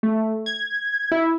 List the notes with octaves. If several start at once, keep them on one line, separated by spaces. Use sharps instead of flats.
A3
G#6
E4